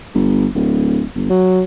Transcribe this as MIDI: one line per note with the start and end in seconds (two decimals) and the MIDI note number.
0.15 0.46 31
0.55 1.04 26
1.16 1.28 31
1.30 1.62 54